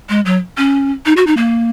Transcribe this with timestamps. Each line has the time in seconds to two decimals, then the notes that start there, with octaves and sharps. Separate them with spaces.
0.09 G#3
0.26 F#3
0.57 C#4
1.06 D#4
1.17 F#4
1.27 D#4
1.37 A#3